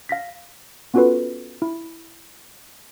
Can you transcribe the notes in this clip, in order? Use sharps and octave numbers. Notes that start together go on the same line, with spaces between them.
F5 A#6 B6
B3 C#4 F4 F#4 A4 B4
E4